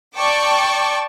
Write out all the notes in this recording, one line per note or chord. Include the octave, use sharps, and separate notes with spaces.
D5 G5 A5 C#6 D6